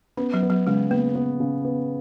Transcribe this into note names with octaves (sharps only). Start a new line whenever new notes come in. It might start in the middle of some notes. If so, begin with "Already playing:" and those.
B3 C#4
F#3
B3
F#3
C#3 G#3
A#3 B3
B3
C#3
B3